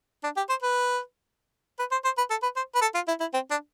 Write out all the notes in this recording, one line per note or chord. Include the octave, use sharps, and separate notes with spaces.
D4
G4
C5
B4
B4
C5
C5
B4
A4
B4
C5
B4
A4
F4
E4
E4
C4
D4